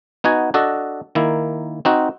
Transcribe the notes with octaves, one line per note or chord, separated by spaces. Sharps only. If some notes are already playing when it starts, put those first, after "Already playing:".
B3 D#4 F#4 G#5
D4 F#4 A4 D#5
D#3 A#3 E4
C4 D#4 F#4